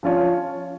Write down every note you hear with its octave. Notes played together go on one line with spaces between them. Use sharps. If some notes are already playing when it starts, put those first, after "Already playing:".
F3 C#4 F4 C#5